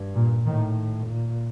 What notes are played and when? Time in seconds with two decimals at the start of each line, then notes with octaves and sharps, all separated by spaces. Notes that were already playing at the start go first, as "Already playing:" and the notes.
Already playing: G2
0.15 A#2
0.45 A2 D#3
1.07 A#2